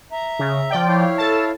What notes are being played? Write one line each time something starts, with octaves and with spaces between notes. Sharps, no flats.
E5 A#5
C#3
F3 D5 G5
E4 C#5 F5
A4 A5